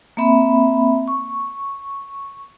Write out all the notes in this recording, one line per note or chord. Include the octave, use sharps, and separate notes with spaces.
A#3 C4 E5 B5
C#6